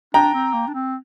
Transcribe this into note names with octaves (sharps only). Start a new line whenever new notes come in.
D4 G5 A#5
C4
A#3
D4
C4